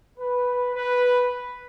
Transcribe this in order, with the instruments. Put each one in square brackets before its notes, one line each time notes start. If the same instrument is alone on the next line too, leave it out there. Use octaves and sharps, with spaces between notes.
[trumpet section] B4
B4